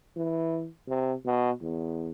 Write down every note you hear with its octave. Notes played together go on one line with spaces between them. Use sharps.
E3
C3
B2
E2